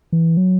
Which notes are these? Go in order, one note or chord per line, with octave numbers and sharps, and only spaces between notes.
E3
F#3